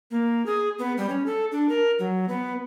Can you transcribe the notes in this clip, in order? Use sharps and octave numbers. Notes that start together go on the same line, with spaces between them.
A#3
G#4
B3
G3
C#4
A4
D4
A#4
F#3
B3